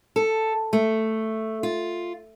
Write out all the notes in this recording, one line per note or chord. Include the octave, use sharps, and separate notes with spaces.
A4
A3
F4